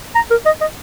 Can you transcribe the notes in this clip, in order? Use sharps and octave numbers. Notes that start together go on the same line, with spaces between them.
A#5
A#4
D#5
D#5